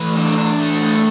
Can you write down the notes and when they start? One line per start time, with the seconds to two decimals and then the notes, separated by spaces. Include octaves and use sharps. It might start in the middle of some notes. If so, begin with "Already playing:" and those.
Already playing: A2 E3 B4
0.16 D4
0.38 D4
0.60 A3
0.82 A2